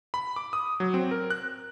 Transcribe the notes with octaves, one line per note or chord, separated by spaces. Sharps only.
B5
D6
D#6
F#3
C4
A#4
F#6